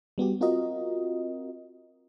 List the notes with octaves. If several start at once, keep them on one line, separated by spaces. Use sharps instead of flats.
G3 B3 F#4 G4
C4 F4 F#4 A#4 D#5